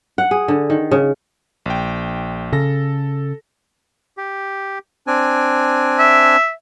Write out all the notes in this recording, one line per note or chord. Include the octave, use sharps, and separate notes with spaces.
F#5
G#4
D3
D#3
C#3
A#1 G5
C#3 A4 A#6
G4
C4 D4 G#5
E5